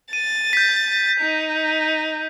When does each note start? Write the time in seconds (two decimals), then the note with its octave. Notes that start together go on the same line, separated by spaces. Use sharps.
0.13 A6 D#7
0.53 G6 B6
1.21 D#4